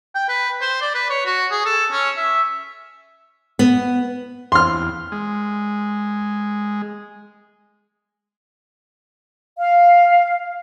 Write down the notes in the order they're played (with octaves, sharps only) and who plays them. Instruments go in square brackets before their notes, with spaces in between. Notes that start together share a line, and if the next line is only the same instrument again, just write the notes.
[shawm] G5
B4
C5
D5
B4
C#5
F#4
G#4
A4
C#4
E5
[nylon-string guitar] B3
[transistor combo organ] E2 [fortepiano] C6 F6
[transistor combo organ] G#3
[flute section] F5